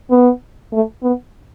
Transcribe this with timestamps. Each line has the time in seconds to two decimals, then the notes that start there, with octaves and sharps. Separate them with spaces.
0.10 B3
0.73 A3
1.03 B3